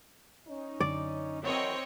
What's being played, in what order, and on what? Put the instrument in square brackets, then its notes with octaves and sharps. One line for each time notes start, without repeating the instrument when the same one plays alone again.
[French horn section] C#4 D#4
[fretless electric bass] F#2 D3 [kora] D5
[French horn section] D#3 E3 F#3 [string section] C4 C#5 D#5